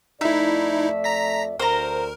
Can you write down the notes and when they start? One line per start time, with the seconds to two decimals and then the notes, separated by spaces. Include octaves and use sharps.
0.21 F2 A3 D#4 E4 D5 E5
1.04 A#5 A#6 B6
1.60 D2 A#4 C5 A#5